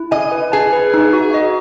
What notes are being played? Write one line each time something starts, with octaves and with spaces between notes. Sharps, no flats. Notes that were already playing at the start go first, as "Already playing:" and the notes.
Already playing: E4
D#5 G#5
B4
G#4 A5
B4
D#4
F#4
D#5